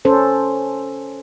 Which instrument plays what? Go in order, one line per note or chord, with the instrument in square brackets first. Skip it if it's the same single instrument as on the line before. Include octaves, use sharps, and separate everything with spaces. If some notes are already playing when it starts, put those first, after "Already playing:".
[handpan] C#4 A4 C5